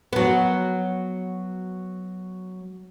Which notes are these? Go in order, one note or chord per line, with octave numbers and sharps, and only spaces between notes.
F#3 B3